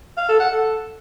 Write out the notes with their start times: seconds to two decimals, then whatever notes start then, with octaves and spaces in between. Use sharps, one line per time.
0.17 F5
0.28 A4
0.40 F#5
0.51 A4